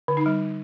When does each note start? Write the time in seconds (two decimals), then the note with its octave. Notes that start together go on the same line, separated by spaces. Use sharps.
0.08 D3
0.17 D#4
0.26 G3